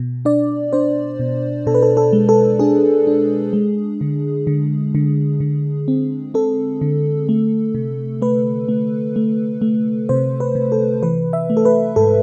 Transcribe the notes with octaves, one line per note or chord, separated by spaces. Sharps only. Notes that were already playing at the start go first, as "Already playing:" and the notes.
Already playing: B2
D4 D5
D4 C5
B2
B2 A4
B4
A4
A4
G#3
A4
D4 G#4
D4
G#3
D3
D3
D3
D3
C4
C4 A4
D3
A3
C3
A3 B4
A3
A3
A3
C3 C5
B4
C3
A4
E3 B4
E5
A3
A4
B4
G#2 A4